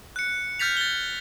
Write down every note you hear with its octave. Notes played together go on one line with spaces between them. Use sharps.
F#6 C#7
F6 G6 A6 B6 F7
A6 G7